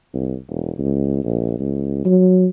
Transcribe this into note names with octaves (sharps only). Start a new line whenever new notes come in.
C2
E1
C#2
A#1
C#2
F#3